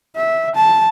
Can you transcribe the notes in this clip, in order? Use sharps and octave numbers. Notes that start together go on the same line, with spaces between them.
E5
A5